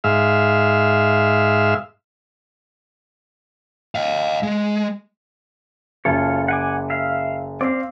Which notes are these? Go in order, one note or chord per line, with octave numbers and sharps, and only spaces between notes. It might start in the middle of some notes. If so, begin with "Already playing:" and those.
G#2 E5 F5
D#5 F5
G#3
F#1 F4 A4 C#5
F#5 G#5 D6
E5 F5
C4 D5 F5